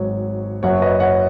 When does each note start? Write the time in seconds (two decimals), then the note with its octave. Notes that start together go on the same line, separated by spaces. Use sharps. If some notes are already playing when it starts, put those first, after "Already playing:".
Already playing: G#1 G#2 F#3 C#5
0.63 F#1 F#2 F#3 C#5 F#5
0.82 B4 D#5
1.00 C#5 F#5